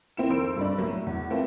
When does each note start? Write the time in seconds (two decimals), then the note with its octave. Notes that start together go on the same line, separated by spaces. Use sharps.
0.17 C4 E4 E7
0.29 F2 D#3 C5 E6 D7
0.56 G2 D4
0.78 A2 F#3
1.07 E2
1.30 A3 C4 F4 A4 B4